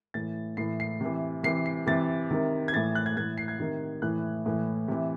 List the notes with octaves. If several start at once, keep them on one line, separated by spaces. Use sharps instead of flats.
A2 E3 A6
A2 E3 C7
C7
C3 E3
C3 E3 C7
C7
C3 E3 A6
C3 D#3
G#6
A2 E3 A6
F#6
G#6
A2 E3 G#6
C7
G#6
C3 D#3
A2 E3 F#6
A2 E3
C3 E3